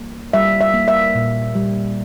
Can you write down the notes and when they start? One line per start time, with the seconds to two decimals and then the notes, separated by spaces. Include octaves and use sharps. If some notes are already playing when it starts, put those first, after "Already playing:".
Already playing: G3 A#3
0.33 G3 E5
0.61 E5
0.74 A#3
0.88 E5
1.15 A#2
1.55 G3